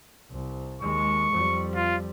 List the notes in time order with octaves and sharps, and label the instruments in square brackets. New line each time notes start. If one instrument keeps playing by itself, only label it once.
[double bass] C2
[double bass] D#2 G#3 [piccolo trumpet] C#6
[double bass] F2 G3
[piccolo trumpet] F4